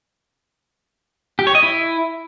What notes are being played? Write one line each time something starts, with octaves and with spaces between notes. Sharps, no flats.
G4
C#5
D#5
E4